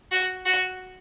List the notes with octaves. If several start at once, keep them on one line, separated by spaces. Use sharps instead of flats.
F#4
F#4